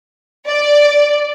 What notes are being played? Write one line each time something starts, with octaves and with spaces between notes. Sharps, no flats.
D5